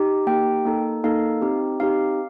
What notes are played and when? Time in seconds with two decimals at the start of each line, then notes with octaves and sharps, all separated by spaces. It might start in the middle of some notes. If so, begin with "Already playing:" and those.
Already playing: D#4 G4
0.27 A#3 D#4 G4 G5
0.65 A#3 D#4 A4
1.04 A#3 D#4 A4 F5
1.41 C4 D#4 G4
1.80 C4 D#4 G4 F5